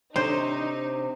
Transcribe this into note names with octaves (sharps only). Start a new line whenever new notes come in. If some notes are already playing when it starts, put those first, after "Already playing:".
C3 D4 D#4 C5 C#5